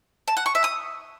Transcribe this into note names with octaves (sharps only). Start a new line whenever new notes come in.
A5
F#5
C#6
E5
D#6